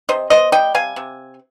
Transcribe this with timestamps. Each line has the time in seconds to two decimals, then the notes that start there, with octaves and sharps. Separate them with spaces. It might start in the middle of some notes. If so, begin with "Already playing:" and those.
0.09 C3 C5 D#5
0.30 B3 C5 D#5
0.52 G3 D#5 G5
0.74 C3 F5 G#5
0.96 C3